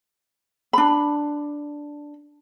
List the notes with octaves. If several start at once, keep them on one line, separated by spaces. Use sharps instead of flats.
D4 B5